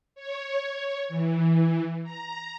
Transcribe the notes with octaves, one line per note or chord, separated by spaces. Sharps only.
C#5
C#5
E3
A#5